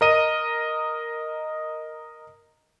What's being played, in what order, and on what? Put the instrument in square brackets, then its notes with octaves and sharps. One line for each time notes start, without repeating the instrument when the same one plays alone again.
[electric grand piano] A#4 D#5 D#7